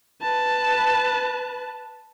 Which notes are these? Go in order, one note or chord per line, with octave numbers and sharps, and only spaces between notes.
B4 A5